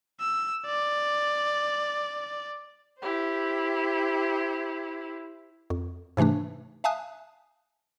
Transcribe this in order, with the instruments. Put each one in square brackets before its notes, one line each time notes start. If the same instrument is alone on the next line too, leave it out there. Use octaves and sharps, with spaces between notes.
[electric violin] E6
D5
[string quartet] E4 G4 C5
[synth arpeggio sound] F2
G#2 C3 E3 A3 D4
E5 F5 G#5 A5 D#6 F#6